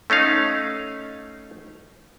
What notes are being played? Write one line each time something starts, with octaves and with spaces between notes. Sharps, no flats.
A3 C#4 D#4 F5